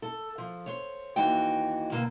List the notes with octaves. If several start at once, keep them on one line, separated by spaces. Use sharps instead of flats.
A4
F3
C5 C#5
D#2 E3 D#4 F#4 G5
B2 D3 A#3